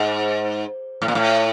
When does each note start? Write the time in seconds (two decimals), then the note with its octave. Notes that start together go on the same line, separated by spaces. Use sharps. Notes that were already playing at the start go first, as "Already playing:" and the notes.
Already playing: G#2
1.02 A2
1.08 A#2
1.15 A2